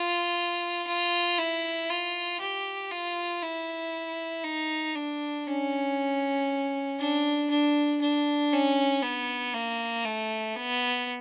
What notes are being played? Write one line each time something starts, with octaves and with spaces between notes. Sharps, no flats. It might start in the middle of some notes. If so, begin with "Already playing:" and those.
Already playing: F4
F4
E4
F4
G4
F4
E4
D#4
D4
C#4
D4
D4
D4
C#4
B3
A#3
A3
B3